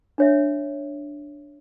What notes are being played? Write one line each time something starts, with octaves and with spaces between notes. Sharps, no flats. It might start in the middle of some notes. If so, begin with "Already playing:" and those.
D4 C#5 E5